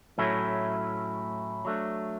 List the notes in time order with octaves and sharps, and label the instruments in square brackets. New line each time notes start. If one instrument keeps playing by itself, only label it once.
[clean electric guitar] A2 F#3 A3 C#4 E4
F#3 A3 D4